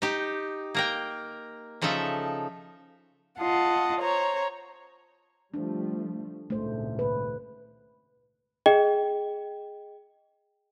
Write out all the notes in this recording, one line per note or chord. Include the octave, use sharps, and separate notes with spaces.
D#4 G4
A#3 A#4 G5
C#3 F3 D#4 A4 E5
F4 D#5 F#5 A5
C5 C#5 A#5
F3 G3 A3 D4
G#1 C#2 A#2 A3 C5
B4
G#4 D#5 G5